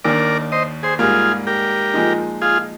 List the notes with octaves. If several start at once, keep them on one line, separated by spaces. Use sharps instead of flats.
D#2 D#3 A#3 D4 A#4 D5
C5 D#5
G#4 C5
G#2 G3 A#3 F4 G#4
G4 A#4
A#2 F3 G#3 D#4
F4 G#4